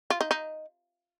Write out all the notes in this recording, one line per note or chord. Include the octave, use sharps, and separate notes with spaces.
F4
D#4
D#4